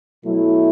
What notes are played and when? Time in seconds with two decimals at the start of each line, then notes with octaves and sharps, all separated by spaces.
0.23 B2 F#3 A3 E4